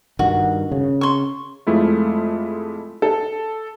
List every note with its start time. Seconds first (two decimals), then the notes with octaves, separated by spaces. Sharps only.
0.19 G2 D#3 F#4
0.72 C#3
1.01 C6 C#6
1.67 F2 G#3 A3 E4 F4
3.02 A4